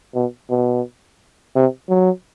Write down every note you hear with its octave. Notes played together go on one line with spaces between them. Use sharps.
B2
B2
C3
F#3